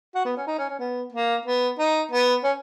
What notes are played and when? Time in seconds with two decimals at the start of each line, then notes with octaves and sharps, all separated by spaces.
0.15 F#4
0.25 B3
0.37 C#4
0.47 D#4
0.59 C#4
0.69 C#4
0.80 B3
1.13 A#3
1.46 B3
1.79 D#4
2.12 B3
2.44 C#4